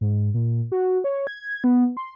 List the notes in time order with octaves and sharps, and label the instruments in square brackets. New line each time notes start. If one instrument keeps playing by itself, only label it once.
[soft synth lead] G#2
A#2
F#4
C#5
G#6
B3
C6